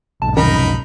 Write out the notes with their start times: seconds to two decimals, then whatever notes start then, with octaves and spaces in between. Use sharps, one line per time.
0.22 B1 G#2 A5
0.37 F2 C3 D#3 C#4 D#4 A#4 B5